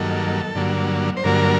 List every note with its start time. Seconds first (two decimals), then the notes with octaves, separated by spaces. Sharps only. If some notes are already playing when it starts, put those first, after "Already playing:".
Already playing: G2 D#3 F#3 A#3 A4
0.55 G2 D3 F#3 A#3
1.17 C5
1.24 G2 D3 F#3 A#3 A#4